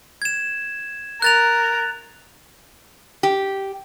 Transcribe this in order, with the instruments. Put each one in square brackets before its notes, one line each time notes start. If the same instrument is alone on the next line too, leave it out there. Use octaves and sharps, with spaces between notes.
[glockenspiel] G#6 E7
[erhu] A#4 [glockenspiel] F#6 A6 F7
[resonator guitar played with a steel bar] G4